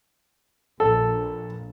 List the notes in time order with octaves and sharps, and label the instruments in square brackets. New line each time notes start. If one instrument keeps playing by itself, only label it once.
[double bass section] A#1 [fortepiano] A4